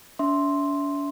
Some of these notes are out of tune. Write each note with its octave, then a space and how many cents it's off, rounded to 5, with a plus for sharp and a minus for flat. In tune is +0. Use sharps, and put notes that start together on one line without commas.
D4 -45 E5 +0 C6 +0